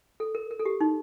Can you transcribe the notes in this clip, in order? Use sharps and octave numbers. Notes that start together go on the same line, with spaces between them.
A4
A#4
A#4
A4
G4
D#4